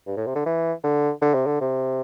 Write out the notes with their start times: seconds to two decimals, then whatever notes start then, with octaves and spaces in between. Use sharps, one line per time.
0.07 G2
0.17 A2
0.27 C3
0.36 D3
0.46 E3
0.84 D3
1.22 D3
1.34 C3
1.46 D3
1.61 C3